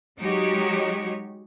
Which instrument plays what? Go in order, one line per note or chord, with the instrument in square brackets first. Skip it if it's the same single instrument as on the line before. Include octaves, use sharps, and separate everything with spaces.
[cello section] F#3 G#3 D#4 F#4 G4 C#5